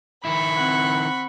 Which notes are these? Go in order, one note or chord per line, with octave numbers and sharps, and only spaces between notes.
D#3 E4 B5 C#6
C4 F#5